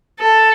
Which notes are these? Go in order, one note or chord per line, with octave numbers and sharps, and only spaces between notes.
A4